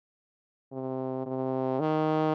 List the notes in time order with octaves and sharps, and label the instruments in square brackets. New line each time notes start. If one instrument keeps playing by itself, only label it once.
[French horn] C3
C3
D#3